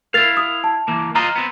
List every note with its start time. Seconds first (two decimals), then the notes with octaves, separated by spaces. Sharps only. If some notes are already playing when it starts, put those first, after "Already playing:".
0.14 E4 A#4 F5 A6 C7
0.37 D#6
0.64 A5
0.88 E3 A#3
1.15 F4 C5 D#5 A#5
1.36 B3 C4